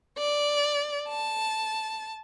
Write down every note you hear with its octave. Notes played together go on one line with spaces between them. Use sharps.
D5
A5